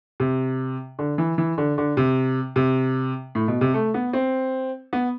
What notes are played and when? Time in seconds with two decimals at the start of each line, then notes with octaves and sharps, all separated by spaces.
0.20 C3
0.99 D3
1.18 E3
1.38 E3
1.58 D3
1.78 D3
1.97 C3
2.56 C3
3.35 A2
3.48 B2
3.61 C3
3.74 A3
3.94 B3
4.13 C4
4.93 B3